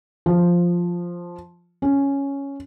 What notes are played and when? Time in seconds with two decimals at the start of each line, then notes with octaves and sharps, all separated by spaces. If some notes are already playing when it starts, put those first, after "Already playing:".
0.26 F3
1.82 C#4